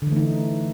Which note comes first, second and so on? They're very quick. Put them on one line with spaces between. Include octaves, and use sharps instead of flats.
D3 E3 A3 D#4